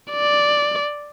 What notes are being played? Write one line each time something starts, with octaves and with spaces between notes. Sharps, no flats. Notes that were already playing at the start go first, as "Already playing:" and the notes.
D5